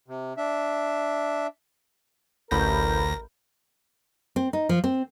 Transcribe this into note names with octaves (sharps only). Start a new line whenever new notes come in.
C3
D4 E5
A1 D2 A#4 B5 G6 A#6
C4
D#4
F3
C4